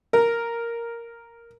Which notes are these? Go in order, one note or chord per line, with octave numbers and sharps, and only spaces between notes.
A#4